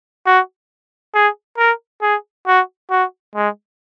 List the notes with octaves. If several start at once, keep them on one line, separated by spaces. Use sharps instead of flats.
F#4
G#4
A#4
G#4
F#4
F#4
G#3